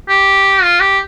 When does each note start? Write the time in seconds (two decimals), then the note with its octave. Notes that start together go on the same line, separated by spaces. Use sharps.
0.09 G4
0.62 F4
0.80 G4